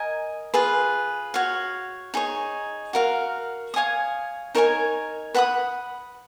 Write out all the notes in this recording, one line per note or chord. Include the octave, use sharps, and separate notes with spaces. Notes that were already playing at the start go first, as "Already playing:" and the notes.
Already playing: A#4 D#5 G#5
F4 G#4 B4
F#4 C#5 F5
D#4 G#4 C#5
F#4 A#4 F5
C#5 F5 G#5 D#6
D#4 A#4 C#5 G#5
B4 F#5 B5 D#6